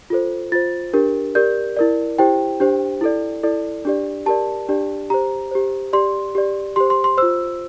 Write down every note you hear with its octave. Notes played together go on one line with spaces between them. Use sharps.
F4 A4 C5
F4 C5 A6
D4 G4 A#4
G4 A#4 D5 G6
E4 A#4 D5
E4 G4 C5 G5
D4 G4 C5
E4 A4 D5
E4 A4 D5
D4 G4 D5
G4 A#4 D5 A5
D4 G4 D5
G4 C5 A#5
G4 C5
G4 D5 C6
G4 D5
G4 C5 C6
C6
C6
F4 C5 E6